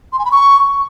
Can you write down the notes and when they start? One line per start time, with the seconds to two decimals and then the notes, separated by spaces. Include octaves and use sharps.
0.13 C6
0.19 G#5
0.25 B5
0.32 C#6